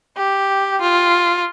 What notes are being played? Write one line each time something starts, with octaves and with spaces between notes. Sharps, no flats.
G4
F4